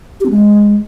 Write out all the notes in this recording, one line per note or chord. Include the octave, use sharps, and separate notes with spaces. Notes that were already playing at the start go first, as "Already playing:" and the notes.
G4
C4
G#3